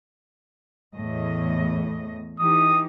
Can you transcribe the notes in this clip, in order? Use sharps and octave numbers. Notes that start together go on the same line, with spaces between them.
E2 A2 D#5
E3 D#4 G4 D#6